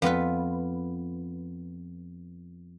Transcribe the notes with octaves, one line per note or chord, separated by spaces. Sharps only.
F2 B3 F4 B4